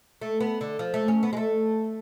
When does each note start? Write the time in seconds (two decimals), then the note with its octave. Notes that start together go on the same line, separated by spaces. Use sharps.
0.21 A3
0.40 B3
0.61 D3
0.79 F3
0.94 A3
1.08 C#4
1.23 B3
1.33 G#3
1.37 A3